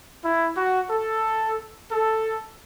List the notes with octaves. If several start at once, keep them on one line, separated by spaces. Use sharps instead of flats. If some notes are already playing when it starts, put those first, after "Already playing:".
E4
F#4
A4
A4